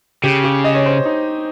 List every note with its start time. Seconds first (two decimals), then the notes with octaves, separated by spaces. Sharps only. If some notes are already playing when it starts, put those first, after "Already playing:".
0.24 C#3 G4
0.44 G4
0.64 D#5
0.74 C#5
0.86 C5
1.05 D#4